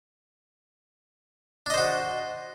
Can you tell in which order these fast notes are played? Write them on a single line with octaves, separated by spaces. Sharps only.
D4 D#5 C5 F#4